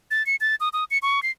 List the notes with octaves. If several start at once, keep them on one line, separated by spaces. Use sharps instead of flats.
A6
C#7
A6
D#6
D#6
C#7
C#6
C7